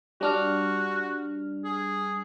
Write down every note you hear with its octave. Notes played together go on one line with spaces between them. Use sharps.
G3 D4 F#4 F6
G#4